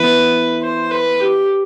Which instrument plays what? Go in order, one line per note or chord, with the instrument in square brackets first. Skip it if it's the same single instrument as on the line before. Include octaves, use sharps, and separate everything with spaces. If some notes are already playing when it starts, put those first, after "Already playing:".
Already playing: [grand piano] E3 B3 E4 E5 [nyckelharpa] B4
[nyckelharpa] C5
B4
G4